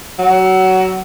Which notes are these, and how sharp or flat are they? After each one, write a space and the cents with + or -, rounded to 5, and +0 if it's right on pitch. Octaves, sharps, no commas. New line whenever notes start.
F#3 +20